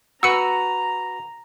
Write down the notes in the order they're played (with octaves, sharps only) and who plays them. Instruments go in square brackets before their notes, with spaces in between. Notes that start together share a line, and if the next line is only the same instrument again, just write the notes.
[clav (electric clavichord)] F#4 B4 [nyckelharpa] A#5 [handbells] E6 C#7